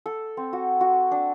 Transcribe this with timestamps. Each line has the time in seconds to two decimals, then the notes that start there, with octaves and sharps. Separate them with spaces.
0.06 A4
0.37 C4
0.53 F#4
0.81 F#4
1.11 D4